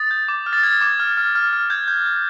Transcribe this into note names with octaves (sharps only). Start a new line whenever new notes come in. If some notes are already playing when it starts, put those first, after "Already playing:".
Already playing: D#6 A6
G6
D6
F6
A6
F6 G#6
D6
F6
F6
F6
F6
G6 G#6
G6
G6